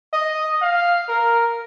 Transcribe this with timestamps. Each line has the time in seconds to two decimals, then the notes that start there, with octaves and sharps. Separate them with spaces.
0.13 D#5
0.61 F5
1.08 A#4